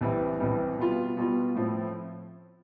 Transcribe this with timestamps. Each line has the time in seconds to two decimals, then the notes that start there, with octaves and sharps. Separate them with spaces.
0.01 C2 C3 E3 G3
0.40 C2 C3 E3 G3
0.78 B2 G3 B3 F4
1.17 B2 G3 B3 F4
1.55 A2 F3 C4